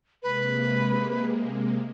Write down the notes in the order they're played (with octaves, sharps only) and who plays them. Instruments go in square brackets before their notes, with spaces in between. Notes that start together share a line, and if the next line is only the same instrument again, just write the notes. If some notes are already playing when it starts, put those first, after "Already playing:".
[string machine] C3 G#3 A#3 [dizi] B4